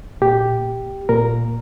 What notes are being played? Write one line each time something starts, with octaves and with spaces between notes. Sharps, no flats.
A#2 G4
A#2 A#4